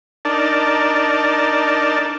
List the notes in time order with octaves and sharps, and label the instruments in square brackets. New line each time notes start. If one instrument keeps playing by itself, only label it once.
[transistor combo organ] D4 D#4 A#4 D5 A5